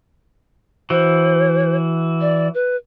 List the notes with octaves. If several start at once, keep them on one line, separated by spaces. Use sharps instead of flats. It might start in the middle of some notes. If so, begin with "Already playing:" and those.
E3 F#4 C5
D5
B4